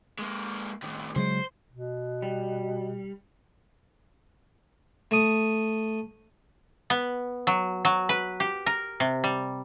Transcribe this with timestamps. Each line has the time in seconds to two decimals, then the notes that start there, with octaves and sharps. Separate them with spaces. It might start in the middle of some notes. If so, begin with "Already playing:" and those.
0.19 G#3 A#3
0.83 A2 D#3
1.16 C#3 F#3 G#3 C5
1.71 B2
2.22 G3
5.11 A3 D#6
6.90 B3
7.47 F#3
7.85 F#3
8.09 B4
8.40 G4
8.66 A#4
9.00 C3
9.24 G3